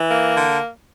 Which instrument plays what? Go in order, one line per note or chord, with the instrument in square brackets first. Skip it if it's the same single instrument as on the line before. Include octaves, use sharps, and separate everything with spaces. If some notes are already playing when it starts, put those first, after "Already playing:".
Already playing: [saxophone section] E3
A#3
D3